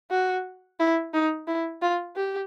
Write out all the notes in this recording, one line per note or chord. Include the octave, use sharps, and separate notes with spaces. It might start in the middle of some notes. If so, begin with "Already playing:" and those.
F#4
E4
D#4
E4
F4
G4